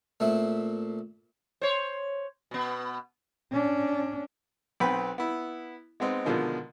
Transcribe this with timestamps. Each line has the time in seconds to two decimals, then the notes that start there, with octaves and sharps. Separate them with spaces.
0.20 A#2 A3 C4 E4
1.61 C5 C#5
2.51 B2 B3
3.52 C#4 D4
4.80 B1 B3 C4 B4 G5 B5
5.18 B3 E4
6.00 G#3 B3 C4 D#4
6.25 B2 D3 D#3 F3 G#3